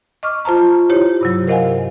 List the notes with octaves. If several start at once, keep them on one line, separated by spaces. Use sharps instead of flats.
D#5 C#6 D6 F6
F4 C5 A5 A#5
E4 G4 C5 C#5
G2 C3 F#3
A#4 C5 D#5 F5 F#5 G#5